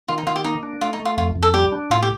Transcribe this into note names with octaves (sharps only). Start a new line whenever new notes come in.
D#3 F4
D#4
D#3 F4
G4
A#3 D#4
D4
A3 F4
D#4
A3
F4
F2 F4
F2
A4
G3 G4
D4
A2 F4
G4